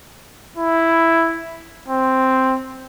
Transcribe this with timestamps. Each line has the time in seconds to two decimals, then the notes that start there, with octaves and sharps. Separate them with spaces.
0.57 E4
1.88 C4